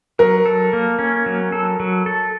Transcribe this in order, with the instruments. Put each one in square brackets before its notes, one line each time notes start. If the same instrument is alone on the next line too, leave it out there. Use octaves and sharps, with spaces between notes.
[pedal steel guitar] F#3 [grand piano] A#4
[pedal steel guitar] A4
A#3
C#4
F#3
A4
F#3
A4